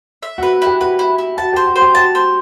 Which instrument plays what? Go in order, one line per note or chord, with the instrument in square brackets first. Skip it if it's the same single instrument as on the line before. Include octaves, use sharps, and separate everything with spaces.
[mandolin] E5
[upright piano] F#4 [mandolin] B4
[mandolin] E4 [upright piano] G4
[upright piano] F#4 [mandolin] B4
[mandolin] E4
E4
[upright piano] F#4 [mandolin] A5
[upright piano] G4 [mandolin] C5
[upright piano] F#4
[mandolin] C5
[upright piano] G4
[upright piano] F#4 [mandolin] A5
[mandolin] C5